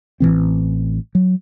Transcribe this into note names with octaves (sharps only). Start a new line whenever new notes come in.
A1 D3 E3 C4
F#3